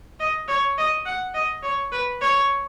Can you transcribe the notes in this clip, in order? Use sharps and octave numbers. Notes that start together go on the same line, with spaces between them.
D#5
C#5
D#5
F#5
D#5
C#5
B4
C#5